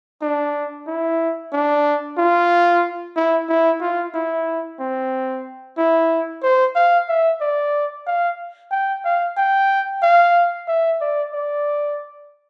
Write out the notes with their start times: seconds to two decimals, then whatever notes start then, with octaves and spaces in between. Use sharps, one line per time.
0.22 D4
0.87 E4
1.53 D4
2.18 F4
3.16 E4
3.49 E4
3.81 F4
4.14 E4
4.80 C4
5.78 E4
6.43 C5
6.76 F5
7.09 E5
7.41 D5
8.07 F5
8.72 G5
9.05 F5
9.37 G5
10.03 F5
10.68 E5
11.01 D5
11.33 D5